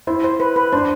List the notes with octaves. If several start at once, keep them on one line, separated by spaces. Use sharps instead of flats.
E4 C5
C5
B4
B4
D4 C5